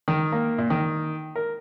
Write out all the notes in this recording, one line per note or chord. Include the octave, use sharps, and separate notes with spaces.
D#3
A#3
A#2
D#3
A#4